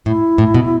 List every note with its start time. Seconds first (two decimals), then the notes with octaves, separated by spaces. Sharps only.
0.06 A2 E4
0.38 A2
0.54 B2